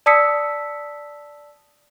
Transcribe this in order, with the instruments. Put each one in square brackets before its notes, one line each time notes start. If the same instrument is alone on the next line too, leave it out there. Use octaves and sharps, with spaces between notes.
[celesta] D5 A5 D#6 E6 B6 C#7